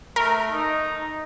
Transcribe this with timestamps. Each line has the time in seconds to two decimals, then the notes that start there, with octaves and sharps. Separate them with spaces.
0.16 A3 A#4
0.52 D#4